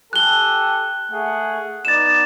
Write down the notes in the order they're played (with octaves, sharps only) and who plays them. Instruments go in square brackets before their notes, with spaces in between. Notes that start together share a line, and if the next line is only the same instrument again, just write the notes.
[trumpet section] G4 A4 G#5 [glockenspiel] F#6 G7
[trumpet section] A3 G#4 F#5
[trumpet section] B3 D#4 D5 [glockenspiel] A6 E7